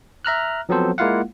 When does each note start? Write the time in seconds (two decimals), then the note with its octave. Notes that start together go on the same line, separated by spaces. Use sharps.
0.25 E5 A#5 F6 F#6
0.69 F3 F#3 B3 C4 A4 C5
0.98 G#3 A#3 E4 F4 F5 F#5